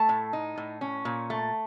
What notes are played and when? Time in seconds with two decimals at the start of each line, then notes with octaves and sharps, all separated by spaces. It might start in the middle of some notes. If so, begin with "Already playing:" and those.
Already playing: A3 A5
0.09 A2
0.33 D#4
0.58 A2
0.81 C#4
1.05 A#2
1.30 A3